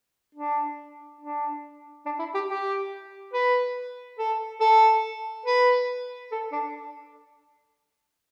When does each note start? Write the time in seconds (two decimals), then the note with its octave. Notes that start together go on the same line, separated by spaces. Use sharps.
0.35 D4
1.21 D4
2.06 D4
2.19 E4
2.34 G4
2.49 G4
3.33 B4
4.19 A4
4.61 A4
5.46 B4
6.32 A4
6.52 D4